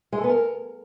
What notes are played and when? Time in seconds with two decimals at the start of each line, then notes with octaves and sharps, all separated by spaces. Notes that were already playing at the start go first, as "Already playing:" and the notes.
0.12 G#3
0.18 A4
0.24 B3
0.29 A#4